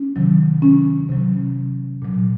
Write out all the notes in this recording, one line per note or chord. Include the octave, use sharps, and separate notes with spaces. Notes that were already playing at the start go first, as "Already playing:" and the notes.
Already playing: C#4
C3 D#3 F#3
C#4
C3 F#3
A#2 F#3